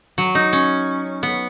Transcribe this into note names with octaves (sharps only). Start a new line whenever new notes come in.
F#3
D#4
C#4
B3